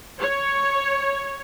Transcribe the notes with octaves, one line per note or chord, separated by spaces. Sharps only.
C#5